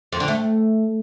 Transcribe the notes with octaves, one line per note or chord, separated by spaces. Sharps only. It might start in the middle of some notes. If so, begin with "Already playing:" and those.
F2
D3
A3